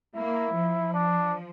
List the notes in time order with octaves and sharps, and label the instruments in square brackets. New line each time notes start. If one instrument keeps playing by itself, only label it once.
[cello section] A#3 [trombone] E4
[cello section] F3
[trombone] D4